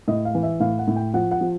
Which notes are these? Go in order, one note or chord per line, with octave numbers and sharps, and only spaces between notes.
A2 D#5
F5
E3
E5
A2 F5
F#5
A2
G5
F3 F#5
F#5
F3